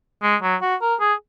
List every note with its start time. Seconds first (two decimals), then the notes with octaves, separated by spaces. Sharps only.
0.22 G#3
0.42 F#3
0.62 F#4
0.81 A#4
1.00 G#4